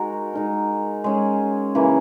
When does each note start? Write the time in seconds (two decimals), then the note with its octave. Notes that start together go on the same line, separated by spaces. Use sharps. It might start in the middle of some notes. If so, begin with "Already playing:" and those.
Already playing: G#3 D#4 F#4 A#4
0.33 G#3 D#4 A#4
1.04 G#3 C#4 G#4
1.75 C#3 E3 A#3